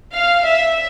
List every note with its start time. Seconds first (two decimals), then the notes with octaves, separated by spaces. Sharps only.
0.13 F5
0.46 E5